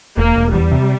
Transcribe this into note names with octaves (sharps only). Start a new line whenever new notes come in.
E1 A#3
E1
E2 G3
C3